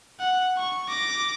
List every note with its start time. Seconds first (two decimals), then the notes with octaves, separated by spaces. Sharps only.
0.20 F#5
0.58 C#6
0.89 D6 A#6